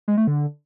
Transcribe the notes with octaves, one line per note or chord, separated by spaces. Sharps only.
G#3
A3
D3